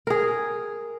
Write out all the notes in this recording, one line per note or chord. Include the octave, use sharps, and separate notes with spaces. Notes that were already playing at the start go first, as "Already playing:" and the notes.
G#4 A#4